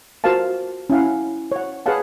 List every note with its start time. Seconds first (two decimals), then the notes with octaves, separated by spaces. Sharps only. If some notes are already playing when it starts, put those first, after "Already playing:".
0.24 F4 F#4 A#4 C5 F5 A5
0.90 C#4 E4 F5 F#5
1.52 C#5 F#5
1.86 G#4 B4 C#5 F5 F#5 A5